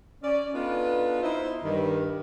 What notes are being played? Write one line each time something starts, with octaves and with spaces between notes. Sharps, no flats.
C#4 D5
B3 D4 D#4 F4 A4 B4
D#4 E4 C5
G2 D#3